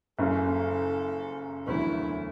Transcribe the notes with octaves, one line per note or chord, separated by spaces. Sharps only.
F#1 F#2 C#3 A4
E1 D2 D3 F#3 B3 E4